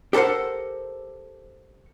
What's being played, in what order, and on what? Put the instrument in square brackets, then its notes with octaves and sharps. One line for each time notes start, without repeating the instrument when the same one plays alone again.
[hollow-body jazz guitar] G4 A4 A#4 C5 F#5